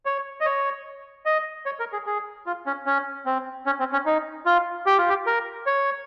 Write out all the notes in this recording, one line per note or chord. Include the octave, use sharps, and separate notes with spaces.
C#5
D#5
C#5
D#5
C#5
A#4
G#4
G#4
F4
C#4
C#4
C4
C#4
C4
C#4
D#4
F4
G4
F4
G4
A#4
C#5